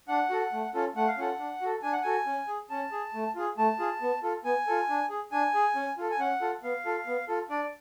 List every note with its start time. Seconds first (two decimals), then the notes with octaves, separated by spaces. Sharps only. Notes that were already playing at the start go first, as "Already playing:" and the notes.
0.08 D4 F#5
0.30 F#4 A4
0.53 A3
0.74 C#4 F4 A4
0.96 A3 F#5
1.08 F5
1.18 C#4 F4 A4 F#5
1.39 D4
1.61 F#4 A4
1.82 D4 G#5
1.93 F#5
2.02 F#4 A4 G#5
2.27 C#4
2.48 G#4
2.70 C#4 A5
2.92 G#4
3.14 A3
3.35 F4 G#4
3.58 A3 A5
3.79 F4 G#4
4.02 B3
4.23 F4 A4
4.44 B3 G#5
4.67 F4 A4
4.89 D4
5.10 G#4
5.32 D4 G#5
5.55 G#4
5.76 C#4
5.98 F4 A4
6.11 G#5
6.19 C#4 F#5
6.41 F4 A4
6.63 B3 F5
6.86 F4 A4
7.07 B3
7.28 F4 A4
7.50 D4 D5